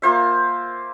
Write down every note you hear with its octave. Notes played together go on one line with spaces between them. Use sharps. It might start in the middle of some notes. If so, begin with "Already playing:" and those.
A#3 F4 C5 E5